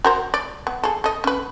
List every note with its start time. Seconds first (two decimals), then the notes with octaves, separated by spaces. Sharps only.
0.05 F#4 A#4 C5
0.34 D5
0.67 B3
0.83 G#4 A4
1.04 A4 D#5
1.24 C#4 B4